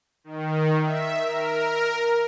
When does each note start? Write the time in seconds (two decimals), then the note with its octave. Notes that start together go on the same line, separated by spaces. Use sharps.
0.24 D#3
0.82 E5
1.19 A#4